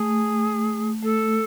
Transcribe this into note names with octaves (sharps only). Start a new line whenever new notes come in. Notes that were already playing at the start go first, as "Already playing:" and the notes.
Already playing: A3 G#4
A3 A4